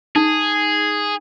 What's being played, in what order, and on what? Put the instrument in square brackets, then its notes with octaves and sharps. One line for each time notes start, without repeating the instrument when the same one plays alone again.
[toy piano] D#4 [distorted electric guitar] G#4